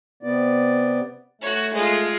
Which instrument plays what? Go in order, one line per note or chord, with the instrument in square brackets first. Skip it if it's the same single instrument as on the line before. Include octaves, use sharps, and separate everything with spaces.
[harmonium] C3 B3 D5
[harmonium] A3 [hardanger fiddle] F#4 C#5
[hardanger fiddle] G#3 F4